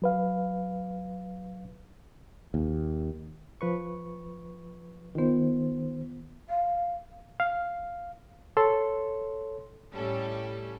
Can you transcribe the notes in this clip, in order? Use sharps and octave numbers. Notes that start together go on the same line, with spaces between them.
F#3 B4 F5
D#2
F3 B4 C#6
D#3 B3 F4 C5
F5
F5
A4 C#5 C6
A2 G3 C#4 A4